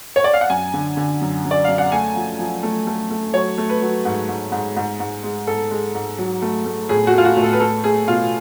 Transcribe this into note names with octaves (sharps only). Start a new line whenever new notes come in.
C#5
D5
F5
F#5
F#2 G#5
D3
D3
F#2
F#2
D5
F#2 F5
F#5
A3 G#5
F3
F3
A3
A3
A3
F#3 C#5
A3
B4
F#3
G#2
G#2
G#2
G#2
G#2
G#3
G#2 A4
G#3
G#2
F#3
A3
A3
A2 G#4
F#4
A3 F4
F#4
A2
A4
B4
A3 A4
A3 G#4
B2 F4